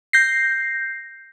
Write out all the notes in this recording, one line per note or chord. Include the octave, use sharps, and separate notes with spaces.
G6 A#6 C7